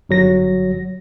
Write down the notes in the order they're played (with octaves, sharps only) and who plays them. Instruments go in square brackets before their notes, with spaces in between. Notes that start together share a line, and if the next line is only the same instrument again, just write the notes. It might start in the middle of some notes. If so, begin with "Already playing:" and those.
[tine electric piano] G1 F#3 A#6